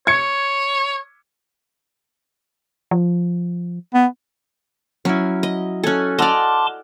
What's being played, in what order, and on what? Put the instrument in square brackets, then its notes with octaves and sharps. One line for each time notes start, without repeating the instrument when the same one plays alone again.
[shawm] C#5 [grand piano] G#6 C#7
[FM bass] F3
[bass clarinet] B3
[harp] F#3 E4 [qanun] C#4
[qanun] D#5
[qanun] C#4 A4 [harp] G#5 F#6
[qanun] D5 D#5 [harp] F#5 E6 F6 [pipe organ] A5 C6 D6